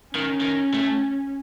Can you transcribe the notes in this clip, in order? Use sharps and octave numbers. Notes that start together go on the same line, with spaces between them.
D#3 C#4
D#3
A3